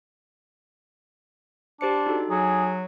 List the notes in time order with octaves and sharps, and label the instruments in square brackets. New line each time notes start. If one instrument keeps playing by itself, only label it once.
[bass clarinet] D4 [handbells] G4 C5 C#7
[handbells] D#4 F#4 A4
[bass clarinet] F#3 [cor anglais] G#4